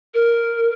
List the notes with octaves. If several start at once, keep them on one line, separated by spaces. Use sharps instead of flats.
A#4